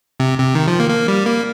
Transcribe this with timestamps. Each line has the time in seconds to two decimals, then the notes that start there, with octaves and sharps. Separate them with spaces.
0.20 C3
0.38 C3
0.55 D#3
0.68 F3
0.80 A#3
0.90 A#3
1.08 G3
1.26 A#3